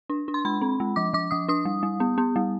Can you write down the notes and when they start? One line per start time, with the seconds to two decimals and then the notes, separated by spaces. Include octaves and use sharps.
0.09 D4
0.28 D4
0.34 C6
0.45 G#3 B5
0.61 C4
0.80 G#3
0.96 F3 D6
1.13 F3 D6
1.31 F3 D#6
1.48 D4 D#6
1.65 G3
1.83 G3
2.00 B3
2.18 B3
2.36 G3